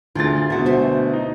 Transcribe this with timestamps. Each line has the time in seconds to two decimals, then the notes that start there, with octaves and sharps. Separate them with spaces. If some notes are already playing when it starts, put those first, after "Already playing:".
0.15 D2 F4 G#4 A6
0.50 D2 B2 E5 F#5
0.66 A3 C5 E5
1.13 D#4